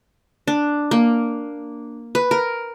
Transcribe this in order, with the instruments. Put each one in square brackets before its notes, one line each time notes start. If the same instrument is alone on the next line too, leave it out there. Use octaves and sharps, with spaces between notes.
[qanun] D4
A#3
B4
A#4